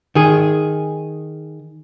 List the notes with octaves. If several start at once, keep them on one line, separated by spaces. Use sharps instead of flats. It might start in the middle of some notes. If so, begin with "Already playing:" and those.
D#3 G#4